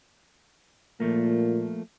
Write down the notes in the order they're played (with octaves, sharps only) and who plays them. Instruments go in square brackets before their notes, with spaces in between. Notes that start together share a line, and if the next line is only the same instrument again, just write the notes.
[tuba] A#2 [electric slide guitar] F3 A3 A#3